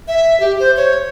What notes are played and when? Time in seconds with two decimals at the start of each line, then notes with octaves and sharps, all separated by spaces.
0.08 E5
0.40 G4
0.60 C5
0.77 C#5